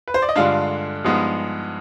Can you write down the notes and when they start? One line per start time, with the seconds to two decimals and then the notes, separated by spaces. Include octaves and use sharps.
0.08 B4
0.14 C5
0.22 D5
0.29 D#5
0.36 G2 D3 G#3 D4 F4 F5
1.04 G2 F3 G#3 B3 D#4